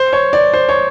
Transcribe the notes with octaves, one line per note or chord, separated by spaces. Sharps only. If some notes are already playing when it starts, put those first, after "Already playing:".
Already playing: C5
C#5
D5
C5
C#5